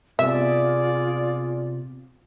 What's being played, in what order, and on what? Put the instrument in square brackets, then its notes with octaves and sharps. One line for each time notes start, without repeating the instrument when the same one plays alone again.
[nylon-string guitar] C3 B3 [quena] F4 [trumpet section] G#4 D5 [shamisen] E5